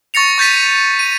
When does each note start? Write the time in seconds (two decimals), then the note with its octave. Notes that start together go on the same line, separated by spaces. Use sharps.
0.14 C#6 A6 A#6 C#7 F7
0.38 C#6 G6 A6 B6 D#7
0.99 D#7